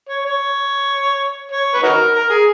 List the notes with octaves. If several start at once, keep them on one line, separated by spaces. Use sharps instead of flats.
C#5
C#5
C#5
B4
D#4 F#4 A#4
A#4
G#4